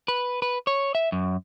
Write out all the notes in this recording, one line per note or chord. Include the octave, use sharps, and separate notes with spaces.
B4
B4
C#5
E5
F#2